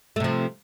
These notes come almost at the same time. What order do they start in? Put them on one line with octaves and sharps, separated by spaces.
A3 C3 F3